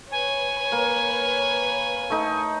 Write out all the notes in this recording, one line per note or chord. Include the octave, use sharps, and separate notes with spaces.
B4 C#5 G#5
A#3
A3 D#4